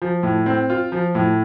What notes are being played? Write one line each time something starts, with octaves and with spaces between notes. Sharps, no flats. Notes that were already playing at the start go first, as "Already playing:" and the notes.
F3
A2
C4
F4
F3
A2